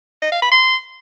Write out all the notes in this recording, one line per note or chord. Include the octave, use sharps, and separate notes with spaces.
D#5
F5
B5
C6